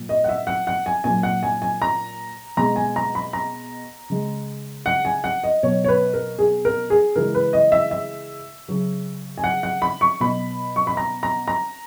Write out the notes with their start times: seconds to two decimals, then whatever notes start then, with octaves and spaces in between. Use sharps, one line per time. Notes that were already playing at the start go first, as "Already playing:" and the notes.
Already playing: A#2 F#3
0.09 D#5
0.24 F#5
0.29 E5
0.47 F#5
0.67 F#5
0.86 G#5
1.04 A#2 F#3 G#5
1.23 F#5
1.43 G#5
1.62 G#5
1.82 A#5
2.57 B2 G#3 A#5
2.76 G#5
2.96 A#5
3.15 B5
3.33 A#5
4.10 C#3 G#3
4.86 F#5
5.05 G#5
5.24 F#5
5.43 D#5
5.63 B2 F#3 C#5
5.84 C#5
5.88 B4
6.14 A#4
6.39 G#4
6.65 A#4
6.90 G#4
7.16 C#3 E3 G#3 A#4
7.35 B4
7.53 D#5
7.72 E5
7.91 E5
8.68 C#3 F#3
9.38 G#5
9.44 F#5
9.63 F#5
9.82 B5
10.01 C#6
10.20 B2 F#3 B5
10.76 C#6
10.87 B5
10.97 A#5
11.23 A#5
11.48 A#5